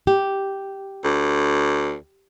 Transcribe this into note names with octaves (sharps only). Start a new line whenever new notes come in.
G4
D2